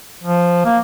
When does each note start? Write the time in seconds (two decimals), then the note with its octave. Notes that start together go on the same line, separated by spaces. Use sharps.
0.23 F3
0.65 A#3